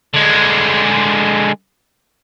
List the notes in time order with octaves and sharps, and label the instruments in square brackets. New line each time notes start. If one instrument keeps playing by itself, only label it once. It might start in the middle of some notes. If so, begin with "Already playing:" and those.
[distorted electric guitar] D3 G#3